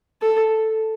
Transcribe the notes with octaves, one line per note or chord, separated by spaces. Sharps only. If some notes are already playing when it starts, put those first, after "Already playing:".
A4